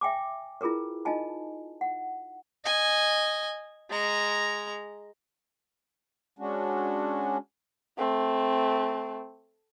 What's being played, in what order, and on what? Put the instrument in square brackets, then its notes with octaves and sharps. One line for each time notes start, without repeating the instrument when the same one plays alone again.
[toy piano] E5 G5 G#5 D6
E4 F4 G#4 A#4 B4
D#4 F4 D#5 G#5 A5
F#5
[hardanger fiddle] D#5 G#5
G#3 A#5
[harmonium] G#3 C#4 D4 F#4
[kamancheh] A3 C4